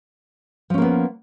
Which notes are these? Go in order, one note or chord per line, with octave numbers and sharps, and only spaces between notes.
F3 A#3 B3 C#4